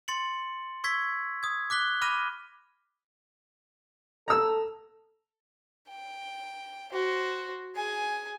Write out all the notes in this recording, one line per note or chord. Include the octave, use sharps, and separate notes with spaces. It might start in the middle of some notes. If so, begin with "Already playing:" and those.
C6 A6 C#7 F#7
C#6 E6 G#6 B6
D#6 G#6
D6 F#6 B6 G7
B5 D6 F6 A#6 D#7
A4 A#5 E6
G5
F#4 C5
G#4 G#5